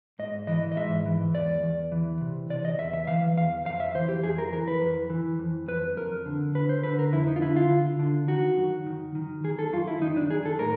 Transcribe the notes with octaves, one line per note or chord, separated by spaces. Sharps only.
G#2 D#5
E3 D#5
D#5
G#2 E5
E3
E2 D5
E2
E3
C3
C3 D5
D#5
E2 E5
E5
E3 F5
E2 F5
F2 F5
E5
E3 C5
G4
F2 G#4
A#4
E3 A#4
B4
F2
E3
F2
F2 B4
F2 A#4
D3
D3 B4
C5
D3 B4
A#4
F2 E4
D#4
F4
D3 E4
F4
D3
D3
D#3 F#4
F#2
D#3
D#3
D#3 G#4
A4
F#2 F4
E4
D#3 D#4
D4
D#3 G#4
A4
A2 A#4